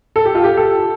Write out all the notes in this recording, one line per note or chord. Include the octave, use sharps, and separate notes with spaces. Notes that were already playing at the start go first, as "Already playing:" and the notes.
A4
G4
F4
G4
A4